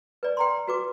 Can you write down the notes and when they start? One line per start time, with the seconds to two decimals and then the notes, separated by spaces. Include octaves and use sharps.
0.23 B4 D5
0.37 G5 A#5 C6
0.68 F#4 B4 D6